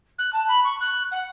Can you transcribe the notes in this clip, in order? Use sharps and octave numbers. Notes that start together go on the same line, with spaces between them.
F#6
A5
B5
C#6
F#6
F#5